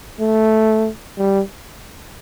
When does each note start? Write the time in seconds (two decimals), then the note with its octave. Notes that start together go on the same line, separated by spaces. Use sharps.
0.20 A3
1.18 G3